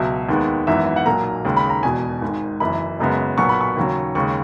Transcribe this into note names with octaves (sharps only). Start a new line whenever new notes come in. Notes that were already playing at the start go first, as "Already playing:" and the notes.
Already playing: C#2 B2 F#3 E5
D#2 D#3 G#3 B3
G#1 F#2 E3 B3 E5
E5
F#5
B1 A#2 F#3 A#3 A#5
D#2 C#3 G#3
B5
A#5
E1 E2 B2 G#5
G#1 G#2 D#3
F#1 F#2 E3 B5
F#1 F#2 C#3 G#3 B3
B1 A#2 F#3 B3 C#6
B5
C#6
D#2 C#3 F#3
D#2 C#3 G#3 C#6